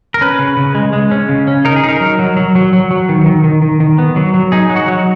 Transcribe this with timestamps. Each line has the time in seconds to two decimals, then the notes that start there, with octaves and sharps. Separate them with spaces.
0.14 A#4
0.21 C#4 B4
0.39 C#3
0.57 C#3
0.75 G#3
0.93 G#3
1.11 C#4
1.29 C#3
1.48 C#4
1.65 D#4 A#4
1.76 G#4
1.84 D#4
1.89 A#4
2.01 F#3
2.19 F#3
2.37 F#3
2.55 F#3
2.73 F#3
2.91 F#3
3.09 D#3
3.26 D#3
3.44 D#3
3.62 D#3
3.80 D#3
3.98 B3
4.16 F#3
4.34 F#3
4.52 D#4 G#4
4.70 F#3
4.76 F#4
4.88 F#3